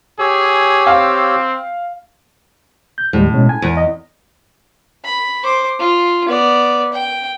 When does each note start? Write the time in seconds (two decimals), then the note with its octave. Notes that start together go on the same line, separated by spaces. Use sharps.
0.19 G4 G#4 C#5 E6
0.87 C4 F5
2.98 G6
3.13 D#2 A2 G3 G#3
3.33 B2 G#3 C#4
3.49 G#5
3.62 E2
3.77 D#5
5.05 B5
5.44 C5 D6
5.79 F4
6.28 B3 D5
6.93 G5